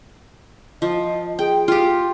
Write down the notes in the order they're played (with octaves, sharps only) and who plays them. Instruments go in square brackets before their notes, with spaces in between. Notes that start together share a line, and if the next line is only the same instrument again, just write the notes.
[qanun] F3 [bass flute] D#5
[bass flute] G#4 [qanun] G5
[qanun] F4 G4